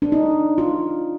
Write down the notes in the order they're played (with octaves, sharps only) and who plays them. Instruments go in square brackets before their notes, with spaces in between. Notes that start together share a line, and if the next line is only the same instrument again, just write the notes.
[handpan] D4
D#4
F4